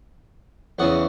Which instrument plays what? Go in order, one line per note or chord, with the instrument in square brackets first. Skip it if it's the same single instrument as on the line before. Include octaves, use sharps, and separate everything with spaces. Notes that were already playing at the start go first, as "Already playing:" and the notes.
[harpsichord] E2 C#3 E3 F#5